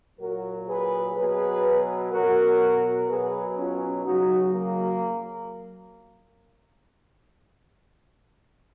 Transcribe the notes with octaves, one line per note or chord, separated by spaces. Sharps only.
A#2 F#3 F#4 A#4
G#4 B4
B2 F#3 G#4 B4
B2 F#3 F#4 A#4
B2 F#3 G#4 B4
C#4 F4
C#3 F#3 D#4 F#4
A#3